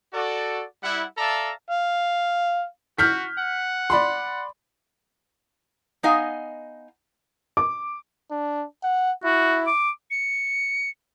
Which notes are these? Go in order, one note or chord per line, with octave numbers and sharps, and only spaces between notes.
F#4 A4 D5
G3 E4 F#5
A4 D5 E5 F5 A5 A#5
F5
F#4 F6 G6 B6
F#5
D5 B5 C6
B3 D#4 D#5 F5 G#5
D6
D4
F#5
E4 F#4
D6
C#7